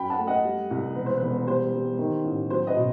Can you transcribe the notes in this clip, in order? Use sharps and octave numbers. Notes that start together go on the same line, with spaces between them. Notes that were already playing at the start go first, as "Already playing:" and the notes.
Already playing: F#2 G5 B5
F#5 A5
A3
D#5 F#5
G3
C2
E1 B4
C5
B4
E1
G3 C5
G3
D#3
A1
F#3 C5
B4 D#5
B2